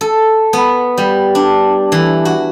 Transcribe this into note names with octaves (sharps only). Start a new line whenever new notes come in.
A4
B3
G3
D4
E3
F#4